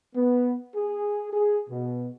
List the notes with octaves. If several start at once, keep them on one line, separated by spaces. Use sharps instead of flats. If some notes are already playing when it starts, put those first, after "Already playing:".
B3
G#4
G#4
B2